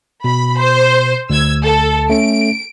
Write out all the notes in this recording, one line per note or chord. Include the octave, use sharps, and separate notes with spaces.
B2 B5
C5
D2 E6 G#6
A4
A3 C#4 D7